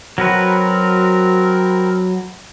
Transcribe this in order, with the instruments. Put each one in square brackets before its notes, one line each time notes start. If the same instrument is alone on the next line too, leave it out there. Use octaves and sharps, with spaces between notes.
[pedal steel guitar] F#3 F#4 B4 [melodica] C4 A#4